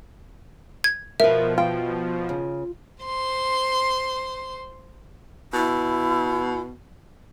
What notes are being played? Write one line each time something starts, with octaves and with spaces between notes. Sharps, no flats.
G#6
B2 F3 A#4 B4 E5
F4 G5
C#3
C5 C6
B2 E4